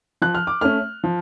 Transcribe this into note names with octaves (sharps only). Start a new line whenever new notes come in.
F3 F#6
F6
D6
A3 C#4 F6
F3